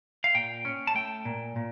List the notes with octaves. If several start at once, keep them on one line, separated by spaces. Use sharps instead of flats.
F5
A#2 G5
C#4
A5
A3 G5
A#2
A#2